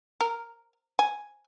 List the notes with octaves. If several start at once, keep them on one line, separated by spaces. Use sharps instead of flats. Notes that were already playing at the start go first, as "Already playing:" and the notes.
A#4
G#5